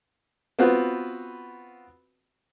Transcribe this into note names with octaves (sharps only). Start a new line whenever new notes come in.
B3 C4 F4 F#4 B4